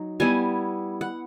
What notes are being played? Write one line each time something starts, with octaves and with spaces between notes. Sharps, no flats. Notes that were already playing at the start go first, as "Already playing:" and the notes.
Already playing: F#3 D#4
G3 B3 E4 G#5
F#5